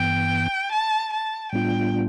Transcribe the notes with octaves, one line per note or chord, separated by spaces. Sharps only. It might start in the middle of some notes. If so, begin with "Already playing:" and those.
Already playing: G2 E3 B3 G5
A5
A5
A2 G3 B3 D4 F4 G5